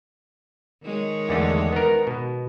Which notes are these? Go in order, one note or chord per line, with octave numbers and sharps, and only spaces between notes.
D#3 G#3 C#5
E2 D3 A3
B3 A#4
B2